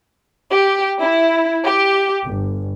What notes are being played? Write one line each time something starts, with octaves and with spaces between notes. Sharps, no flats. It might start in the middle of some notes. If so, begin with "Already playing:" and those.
G4
E4
G4
G1